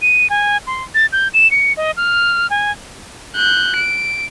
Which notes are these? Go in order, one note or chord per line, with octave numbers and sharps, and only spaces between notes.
D#7
G#5
C6
A6
G6
E7
C#7
D#5
F6
G#5
F#6 G6
D7